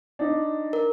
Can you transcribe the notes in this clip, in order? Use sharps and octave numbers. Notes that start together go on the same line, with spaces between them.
D4 D#4
A#4